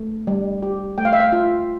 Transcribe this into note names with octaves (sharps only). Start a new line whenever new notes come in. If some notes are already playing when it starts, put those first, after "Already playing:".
Already playing: A3
G3
G4
A3 G5
F5
E5
F5
F4